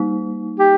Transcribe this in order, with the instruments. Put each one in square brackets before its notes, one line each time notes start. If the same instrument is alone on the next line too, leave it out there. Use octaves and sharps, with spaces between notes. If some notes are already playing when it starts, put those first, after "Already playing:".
Already playing: [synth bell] G3 A#3 D#4
[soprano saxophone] G4